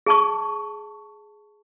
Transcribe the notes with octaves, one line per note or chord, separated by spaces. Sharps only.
G#4 A5 C#6